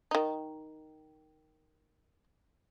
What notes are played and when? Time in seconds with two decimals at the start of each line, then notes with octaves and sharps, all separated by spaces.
0.11 D#3 D#4